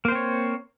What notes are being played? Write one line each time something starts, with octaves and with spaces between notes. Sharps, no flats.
A#3 C4 C5 C#5